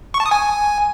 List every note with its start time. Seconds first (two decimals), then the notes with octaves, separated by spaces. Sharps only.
0.14 C#6
0.20 A5
0.26 D#6
0.31 G#5